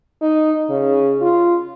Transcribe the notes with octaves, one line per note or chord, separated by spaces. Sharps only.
D#4
C#3
F4